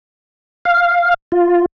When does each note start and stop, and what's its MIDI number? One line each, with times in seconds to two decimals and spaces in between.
0.65 1.14 77
1.32 1.66 65